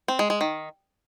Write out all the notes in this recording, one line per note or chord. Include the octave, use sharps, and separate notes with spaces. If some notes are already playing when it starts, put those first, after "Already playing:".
C4
G#3
G#3
D#3